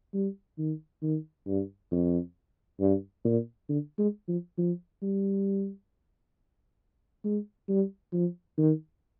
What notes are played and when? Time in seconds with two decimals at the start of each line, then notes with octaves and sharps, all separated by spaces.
0.14 G3
0.58 D#3
1.02 D#3
1.47 G2
1.91 F2
2.80 G2
3.24 A#2
3.69 D3
3.98 G#3
4.28 F3
4.58 F3
5.02 G3
7.24 G#3
7.68 G3
8.13 F3
8.58 D#3